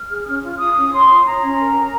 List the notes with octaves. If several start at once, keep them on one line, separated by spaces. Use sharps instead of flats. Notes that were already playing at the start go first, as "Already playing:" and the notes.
Already playing: F6
G#4
C#4
F4
F4 D#6
C#4
C#5 C6
F4
C#5 A#5
C#4
A#4
A#4